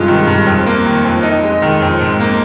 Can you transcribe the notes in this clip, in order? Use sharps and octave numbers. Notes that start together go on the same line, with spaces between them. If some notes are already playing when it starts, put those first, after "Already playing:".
Already playing: G2 C3 G#3 F4
D#3
G2
F2
A#3
D#3
F2
F2 D#4
G#3
D#3
F2
G#2
A#3